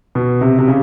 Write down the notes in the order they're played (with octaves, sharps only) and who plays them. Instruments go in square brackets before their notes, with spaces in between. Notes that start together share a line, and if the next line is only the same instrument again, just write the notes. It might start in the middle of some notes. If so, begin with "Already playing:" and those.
[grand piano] B2
C3
C3
C#3